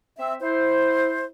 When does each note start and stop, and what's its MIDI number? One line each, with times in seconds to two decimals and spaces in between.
0.17 0.34 60
0.17 0.34 76
0.41 1.26 64
0.41 1.26 72